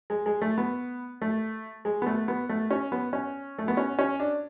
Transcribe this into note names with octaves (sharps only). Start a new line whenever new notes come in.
G#3
G#3
A3
B3
A3
G#3
B3
A3
B3
A3
C#4
B3
C#4
A3
B3
C#4
C#4
D4